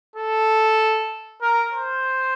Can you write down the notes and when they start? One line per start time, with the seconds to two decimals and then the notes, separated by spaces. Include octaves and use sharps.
0.16 A4
1.42 A#4
1.73 C5